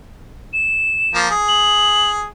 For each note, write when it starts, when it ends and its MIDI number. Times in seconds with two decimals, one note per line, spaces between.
0.53 1.18 100
1.14 1.29 53
1.14 1.29 58
1.31 2.26 68
1.48 2.10 102